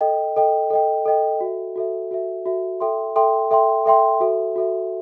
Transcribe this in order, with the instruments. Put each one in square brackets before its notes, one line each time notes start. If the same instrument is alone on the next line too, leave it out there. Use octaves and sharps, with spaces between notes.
[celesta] A4 D#5 G5
A4 D#5 G5
A4 D#5 G5
A4 D#5 G5
F#4 A4 E5
F#4 A4 E5
F#4 A4 E5
F#4 A4 E5
A4 E5 G5 C6
A4 E5 G5 C6
A4 E5 G5 C6
A4 E5 G5 C6
F#4 A4 E5
F#4 A4 E5